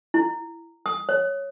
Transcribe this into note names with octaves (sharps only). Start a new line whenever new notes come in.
E4
D#6
C#5